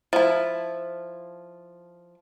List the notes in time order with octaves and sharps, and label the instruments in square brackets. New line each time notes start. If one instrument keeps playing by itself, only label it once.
[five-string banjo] F3 E4